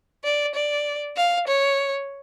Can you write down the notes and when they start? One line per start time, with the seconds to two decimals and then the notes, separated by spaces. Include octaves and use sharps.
0.24 D5
0.55 D5
1.16 F5
1.48 C#5